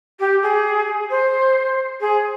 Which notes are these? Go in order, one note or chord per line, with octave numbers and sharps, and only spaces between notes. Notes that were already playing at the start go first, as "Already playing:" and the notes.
G4
G#4
C5
G#4